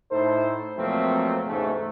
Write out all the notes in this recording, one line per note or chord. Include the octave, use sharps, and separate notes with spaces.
A2 D#4 E4 A4 C5
F2 B2 F#3 A3 A#3 C4
E2 G#2 C#3 A3